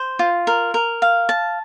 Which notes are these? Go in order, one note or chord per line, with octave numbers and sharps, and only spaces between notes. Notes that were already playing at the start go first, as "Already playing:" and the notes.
Already playing: C5
F4
A#4
A#4
F5
A5